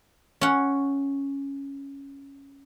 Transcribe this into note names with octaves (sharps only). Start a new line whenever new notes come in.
C#4 F#5